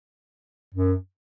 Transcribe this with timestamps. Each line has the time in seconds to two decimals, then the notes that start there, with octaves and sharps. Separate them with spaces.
0.74 F#2